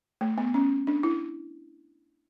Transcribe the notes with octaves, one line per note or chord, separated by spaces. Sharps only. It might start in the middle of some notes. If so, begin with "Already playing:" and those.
A3
B3
C#4
D4
E4